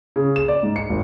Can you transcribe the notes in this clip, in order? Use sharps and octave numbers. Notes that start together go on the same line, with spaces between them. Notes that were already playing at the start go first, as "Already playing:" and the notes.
C#3
E7
D5
G#2
C#7
G#1